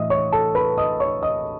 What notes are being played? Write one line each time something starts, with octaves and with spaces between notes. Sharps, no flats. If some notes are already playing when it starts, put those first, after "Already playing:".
Already playing: A2 E3 D#5 E5 D#6
C#5 C#6
A4 A5
B4 B5
D#5 D#6
C#5 C#6
D#5 D#6